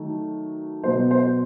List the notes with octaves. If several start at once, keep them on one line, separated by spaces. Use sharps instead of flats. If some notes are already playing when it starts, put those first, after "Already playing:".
Already playing: D#3 F#3 A3
B2 F#3 B3 C5
C5